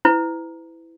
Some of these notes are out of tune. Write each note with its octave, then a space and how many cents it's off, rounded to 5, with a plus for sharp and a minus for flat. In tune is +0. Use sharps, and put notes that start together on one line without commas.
E4 +0 B4 +40